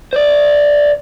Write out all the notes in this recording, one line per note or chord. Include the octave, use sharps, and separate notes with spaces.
C5 D5